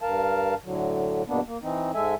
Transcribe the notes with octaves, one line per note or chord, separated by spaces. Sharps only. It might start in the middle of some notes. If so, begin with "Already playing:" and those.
G2 A#4 F5 A5
A2 D3 F#3
E2 G2 B2 A#3 B3 D4
A#3
E3 C4 D#4
G#2 G#3 A4 E5 G#5